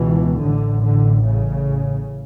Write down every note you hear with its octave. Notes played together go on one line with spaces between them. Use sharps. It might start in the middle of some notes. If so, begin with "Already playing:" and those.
Already playing: C#2 B2 E3
A1 A2 D3
D3
C#3